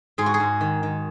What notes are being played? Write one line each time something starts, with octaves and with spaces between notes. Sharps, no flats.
G#2 G#4
F#4
G#4
G#2
D#3
D#3